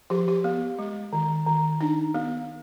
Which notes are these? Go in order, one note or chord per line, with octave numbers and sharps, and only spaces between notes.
F3 G4
G4
B3
G#3
D#3
D#3
D4 D#4
B3